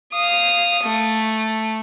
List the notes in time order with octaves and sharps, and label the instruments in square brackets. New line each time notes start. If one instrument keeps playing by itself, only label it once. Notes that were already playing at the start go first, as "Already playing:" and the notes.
[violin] F5 D#6
A3